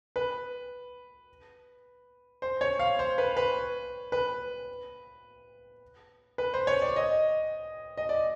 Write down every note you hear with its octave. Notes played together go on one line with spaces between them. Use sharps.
B4
C5
C#5
F5
C5
B4
B4
B4
B4
C5
C#5
D5
D#5
D#5
D5